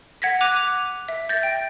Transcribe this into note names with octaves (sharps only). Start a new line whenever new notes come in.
F#5 G#6 A#6 B6
D6 F#6 D#7 F7
E5
G6 A6 A#6
G5